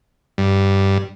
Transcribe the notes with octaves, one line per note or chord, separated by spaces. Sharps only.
G2